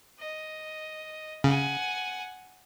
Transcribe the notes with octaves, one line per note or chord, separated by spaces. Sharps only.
D#5
C#3 F#5 G#5